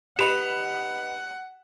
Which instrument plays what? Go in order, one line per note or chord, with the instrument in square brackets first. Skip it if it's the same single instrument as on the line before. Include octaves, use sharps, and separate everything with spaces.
[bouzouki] D#4 B4 D#5 [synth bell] G4 F7 [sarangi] F#5 [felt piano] B5 E7